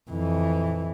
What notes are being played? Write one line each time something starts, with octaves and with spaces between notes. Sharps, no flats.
F2 E3